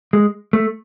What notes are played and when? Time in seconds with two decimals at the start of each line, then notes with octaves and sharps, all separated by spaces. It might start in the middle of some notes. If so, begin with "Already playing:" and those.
0.13 G#3
0.53 A3